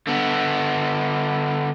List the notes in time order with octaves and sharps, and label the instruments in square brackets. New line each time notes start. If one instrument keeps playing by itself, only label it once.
[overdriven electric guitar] D3 B3